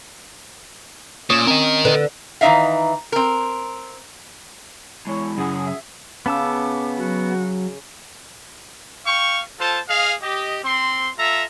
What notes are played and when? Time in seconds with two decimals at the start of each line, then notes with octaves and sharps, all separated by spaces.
1.30 A#2 C#4 D#6 E7
1.47 C4 A#4 D#5
1.85 D3 B4
2.41 D#3 E3 C#4 D#4 E5 F5
3.12 C4 A#4
5.07 E3 G#3 E4 C#5
5.38 F#2 C#3 G#4 F#5
5.66 E5
6.26 C#3 B3 A5 D6 E6
6.98 F#3 F#4
9.06 F5 G5 C#6
9.59 F4 A4 C5 A5
9.89 G#4 D#5 F5
10.22 G4 D#5
10.64 C4 C6
11.18 F4 A4 E5 A#5